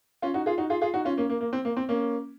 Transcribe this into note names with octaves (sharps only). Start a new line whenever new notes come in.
C#4 F4
D#4 F#4
F4 G#4
D#4 F#4
F4 G#4
F4 G#4
D#4 F#4
C#4 F4
A#3 C#4
A#3
A#3
C4
A#3
C4
A#3 C#4